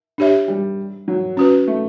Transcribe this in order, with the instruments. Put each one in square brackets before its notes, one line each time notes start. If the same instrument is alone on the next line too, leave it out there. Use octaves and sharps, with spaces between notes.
[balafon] D4 G4 C#5 E5
[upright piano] G3
F#3
[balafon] C#4 F#4 B4
[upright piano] A3